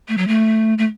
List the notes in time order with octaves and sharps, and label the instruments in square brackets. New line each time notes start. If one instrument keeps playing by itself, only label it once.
[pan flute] A3
F#3
A3
A3